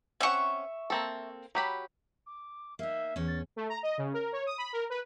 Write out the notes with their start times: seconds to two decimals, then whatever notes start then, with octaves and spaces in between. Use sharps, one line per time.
0.21 C4 C#4 E5 F#5 C#6
0.90 A#3 C4 A4
1.55 F#3 G4 B5
2.26 D6
2.79 A#3 D#4 E5
3.16 E2 C#4
3.28 A6
3.56 A3
3.69 A#5
3.83 D#5
3.98 C#3
4.13 A#4
4.32 C#5
4.46 D#6
4.58 B5
4.73 A#4
4.90 B4